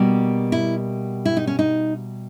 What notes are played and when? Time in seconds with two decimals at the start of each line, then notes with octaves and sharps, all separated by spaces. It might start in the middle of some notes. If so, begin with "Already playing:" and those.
Already playing: B2 G3 A#3
0.52 E4
1.25 E4
1.37 D#4
1.47 C#4
1.59 D#4